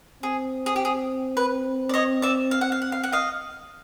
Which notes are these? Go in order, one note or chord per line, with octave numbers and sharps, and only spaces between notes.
C4 G#4
G#4
G4
G#4
B4
D5
C#5 D#5
D5 E5
F5
F#5
F5
F#5
F5
F#5
D#5 F5